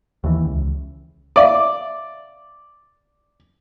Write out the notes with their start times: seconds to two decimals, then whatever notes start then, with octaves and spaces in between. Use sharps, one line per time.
0.24 D#2 E3
0.45 C#2
1.36 D5 E5 F5